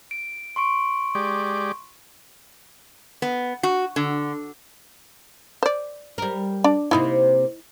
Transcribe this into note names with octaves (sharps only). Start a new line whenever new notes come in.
D7
C6 C#6 D7
G#3 G4 D5
B3
F#4
D3
C5 D5
G3 A#4
D4 D5
C3 A#3 D#4 E4